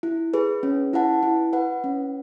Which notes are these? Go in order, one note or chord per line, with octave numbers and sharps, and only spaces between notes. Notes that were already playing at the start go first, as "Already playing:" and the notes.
E4
G#4 B4
C#4
E4 B4 F#5 A5
E4
B4 F#5
C#4